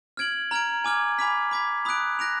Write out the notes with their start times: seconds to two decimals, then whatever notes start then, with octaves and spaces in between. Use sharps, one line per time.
0.17 F6 G#6 D7 F#7
0.51 A#5 F6 G#6 D7
0.84 G#5 D6 F6 G#6
1.18 G#5 B5 D6 F6 B6
1.51 B5 D6 G#6 B6
1.85 B5 D#6 F#6 D7
2.19 F#6 A#6 D7 F7